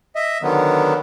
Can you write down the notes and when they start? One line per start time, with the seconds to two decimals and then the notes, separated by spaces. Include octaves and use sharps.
0.16 D#5 E5
0.42 D3 D#3 F#3 B3